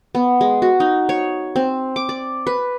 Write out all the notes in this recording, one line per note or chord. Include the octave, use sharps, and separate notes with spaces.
B3
G#3
F#4
D#4
C#5
C4
D6
D5
B4